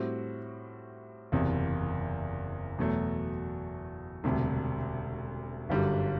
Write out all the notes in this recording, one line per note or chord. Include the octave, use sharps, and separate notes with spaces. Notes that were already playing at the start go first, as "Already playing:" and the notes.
Already playing: A2 G3 C4 F#4
F#1 E2 C3
E2 B2 F#3 A3
E1 D2 C3 G3
G1 F#2 D3 G3